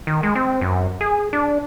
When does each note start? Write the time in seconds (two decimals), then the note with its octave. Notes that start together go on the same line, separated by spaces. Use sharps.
0.07 D#3
0.23 G#3
0.35 C4
0.61 F#2
1.01 G#4
1.33 D4